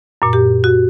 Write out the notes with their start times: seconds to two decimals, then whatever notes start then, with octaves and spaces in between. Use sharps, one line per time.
0.22 F#2 A#2
0.33 G4
0.64 F#4